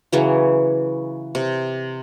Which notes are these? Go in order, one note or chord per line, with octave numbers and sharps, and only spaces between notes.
C#3 E3 F#3
C3